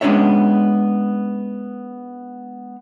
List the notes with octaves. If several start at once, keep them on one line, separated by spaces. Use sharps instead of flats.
G#3 B3 C#4 D4 C#5 E5